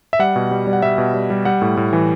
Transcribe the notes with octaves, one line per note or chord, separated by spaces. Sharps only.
E5
G3 F#5
B2
G3
G3
F#5
G3 E5
B2
G3
G3
G3 F#5
A2
A2
E3